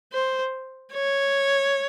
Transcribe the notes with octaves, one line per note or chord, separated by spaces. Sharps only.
C5
C#5